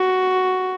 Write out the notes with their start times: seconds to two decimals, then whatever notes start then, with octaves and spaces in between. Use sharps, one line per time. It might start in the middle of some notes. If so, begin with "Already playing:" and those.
Already playing: F#4